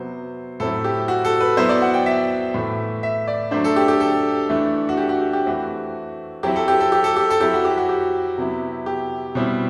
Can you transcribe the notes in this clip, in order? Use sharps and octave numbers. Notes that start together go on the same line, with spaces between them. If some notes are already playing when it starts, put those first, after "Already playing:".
Already playing: C3 F#3 B3 C5
A2 F#3 C4 E4 A4
G4
F#4
A4
B4
F#3 B3 E4 C5
D5
F#5
G5
E5
A2 E3 A3
E5
D5
F#3 A3 D4 C5
A4
G4
G4
A4
E3 A3 D4
F#4
G4
F#4
G4
G4
E3 A3 C4 F#4
F#3 C4 E4 G4
A4
G4
A4
G4
A4
G4
A4
F#3 C4 E4 G4
F#4
G4
F#4
G4
C3 F#3 B3 E4
G4
B2 G3 C4 E4